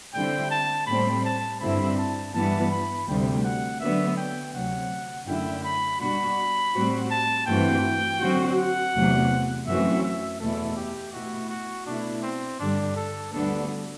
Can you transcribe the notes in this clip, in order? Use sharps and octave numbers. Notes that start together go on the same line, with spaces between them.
D3 G3 C4 E4 G5
A5
A2 G3 C4 B5
A5
G2 D3 G3 C4 E4 B5
A5
G2 E3 G3 B3 A5
B5
D2 C3 G3 G5
F#5
D3 F#3 B3 D4 E5
G5
D2 C3 F#3 F#5
F#2 D3 A3 E4 G5
B5
B2 G3 D4 F#4 B5
A2 G3 C4 F#4
A5
G2 E3 A3 C4 F#4 G5
D3 F#3 C4 F#4
F#5
E2 C3 F#3 A3
F#2 E3 A3 C4 F#4 E5
E5
E2 B2 A3 E4 A4
G4
B2 A3 E4 F#4
F#4
B2 A3 D4 E4
C4
G2 D3 G3 D4
A4
D2 D3 G3 B3 D4 A4